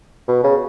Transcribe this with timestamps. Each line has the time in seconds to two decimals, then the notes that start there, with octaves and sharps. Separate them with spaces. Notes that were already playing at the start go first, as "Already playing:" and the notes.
0.28 B2
0.44 C#3